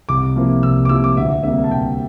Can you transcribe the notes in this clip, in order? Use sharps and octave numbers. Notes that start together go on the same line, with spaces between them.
C2 D6
C3 F3 A#3 E4
C2 E6
D6
C3 F3 A#3 E4 E6
D6
D2 E5
C3 G3 A#3 E5
A5
D2 G5